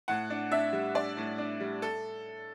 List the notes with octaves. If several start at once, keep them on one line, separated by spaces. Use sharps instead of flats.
A2 F#5
D4
D4 E5
G3
D4 D5
A2
D4
G3
A4